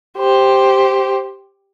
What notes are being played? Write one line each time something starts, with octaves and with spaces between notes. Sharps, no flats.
G4 C5